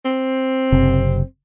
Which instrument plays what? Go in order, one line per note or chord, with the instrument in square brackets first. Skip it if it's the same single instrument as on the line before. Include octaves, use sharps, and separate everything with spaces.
[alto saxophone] C4
[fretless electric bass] F#1 C3